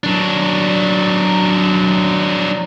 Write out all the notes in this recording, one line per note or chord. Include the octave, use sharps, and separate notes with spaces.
F#3 D4